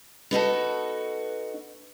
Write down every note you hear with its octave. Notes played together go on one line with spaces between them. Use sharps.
B3 D#4 F#4 A4